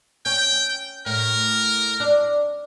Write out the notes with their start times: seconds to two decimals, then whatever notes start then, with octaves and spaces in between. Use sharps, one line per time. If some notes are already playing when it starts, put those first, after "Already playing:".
0.26 C#4 G5
1.06 A2 A#4
2.00 D4